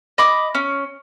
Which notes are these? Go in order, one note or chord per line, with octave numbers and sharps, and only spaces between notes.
D#5 B5 D6
C#4